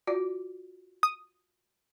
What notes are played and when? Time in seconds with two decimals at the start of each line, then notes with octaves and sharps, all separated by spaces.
0.07 F4 F#4 D5
1.03 D#6